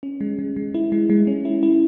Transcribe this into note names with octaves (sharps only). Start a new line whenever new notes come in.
C#4
G#3
G#3
G#3
E4
G#3
G#3
C#4
E4
E4